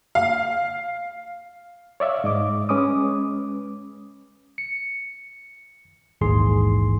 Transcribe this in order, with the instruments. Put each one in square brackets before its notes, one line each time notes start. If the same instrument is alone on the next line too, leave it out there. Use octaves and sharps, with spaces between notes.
[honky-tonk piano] F5
[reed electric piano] C#5 D5 E5 F5
G#2 D#5 D6
G#3 C#4 B4 D6 D#6
[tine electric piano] C#7
A#1 D#2 G#2 E3 G#4 C6